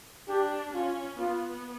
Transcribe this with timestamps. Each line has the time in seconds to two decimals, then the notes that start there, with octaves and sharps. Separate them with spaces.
0.28 D4 G4
0.74 C#4 F4
1.19 B3 F4